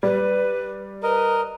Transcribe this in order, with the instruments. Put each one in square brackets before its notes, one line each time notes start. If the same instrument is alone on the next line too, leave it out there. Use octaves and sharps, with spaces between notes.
[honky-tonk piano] G3 [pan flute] B4
[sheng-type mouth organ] A#4 D#5 [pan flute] B4